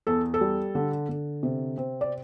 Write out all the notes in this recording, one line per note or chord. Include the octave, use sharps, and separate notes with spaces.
E2 A4
A4
G3
D3
D3
C3
C4
D5